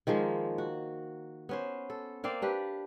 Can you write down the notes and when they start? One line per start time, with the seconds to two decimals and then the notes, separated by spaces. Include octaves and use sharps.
0.07 D#3 F3 G#3 A#3
0.58 F#4
1.49 B3 C#4 C5
1.90 A4
2.24 A#3 C4 D5 F5
2.42 D4 G4 B4